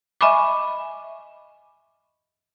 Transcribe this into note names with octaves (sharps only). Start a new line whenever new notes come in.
D#5 E5 G#5 B5 C#6 D6